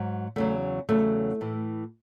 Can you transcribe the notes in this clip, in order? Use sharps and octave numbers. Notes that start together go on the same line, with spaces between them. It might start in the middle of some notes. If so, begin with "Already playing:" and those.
Already playing: G#2 F#3
E2 C#3 F#3 A3
E2 C#3 F#3 A3
A2 E3